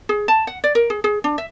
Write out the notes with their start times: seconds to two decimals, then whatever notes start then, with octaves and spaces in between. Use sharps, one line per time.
0.09 G#4
0.28 A5
0.47 F#5
0.64 D5
0.75 A#4
0.90 G#4
1.04 G#4
1.24 D4
1.38 E5